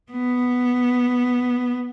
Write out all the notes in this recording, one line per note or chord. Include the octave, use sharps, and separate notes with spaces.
B3